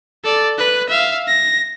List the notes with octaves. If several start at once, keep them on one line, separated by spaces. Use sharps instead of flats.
A4 D5
B4 F#6
E5 F5
A#6